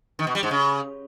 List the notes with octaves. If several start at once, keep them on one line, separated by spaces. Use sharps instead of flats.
D#3
B2
G3
G#2
C#3